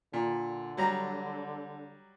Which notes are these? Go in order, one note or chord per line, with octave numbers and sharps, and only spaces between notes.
A#2 D3
F#3 G3 A#5